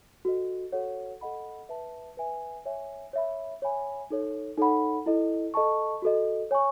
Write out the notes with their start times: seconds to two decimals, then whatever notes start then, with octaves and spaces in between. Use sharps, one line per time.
0.25 F#4 A4 D#5
0.72 F#4 A4 C#5 F#5
1.21 A4 D#5 F#5 B5
1.69 B4 E5 A5
2.17 B4 E5 G#5
2.66 C#5 E5 G#5
3.13 C#5 E5 B5
3.62 C#5 E5 G#5 B5
4.10 D#4 A4 C#5
4.57 D#4 A4 C#5 F#5 B5
5.06 E4 A4 D#5
5.54 A4 D#5 A5 C#6
6.02 F#4 A4 D#5
6.51 C#5 G#5 C#6